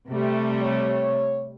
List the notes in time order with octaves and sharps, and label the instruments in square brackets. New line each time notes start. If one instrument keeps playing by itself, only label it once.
[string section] C3 G3 A3
[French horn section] C#5